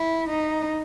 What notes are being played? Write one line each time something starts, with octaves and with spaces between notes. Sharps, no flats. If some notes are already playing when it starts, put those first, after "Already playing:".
Already playing: E4
D#4